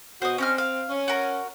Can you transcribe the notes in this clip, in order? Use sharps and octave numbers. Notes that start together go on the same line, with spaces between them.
B2 F#4 C5 D#5
C4 C#4 D#4 F6
F5
C#4
F#4 A#4